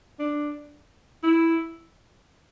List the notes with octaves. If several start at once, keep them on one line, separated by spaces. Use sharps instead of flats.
D4
E4